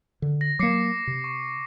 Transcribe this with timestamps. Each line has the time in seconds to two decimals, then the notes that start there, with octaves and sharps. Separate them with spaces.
0.22 D3
0.41 A#6
0.59 F#3 A#3 D6 C7 C#7
1.07 C3
1.24 C#6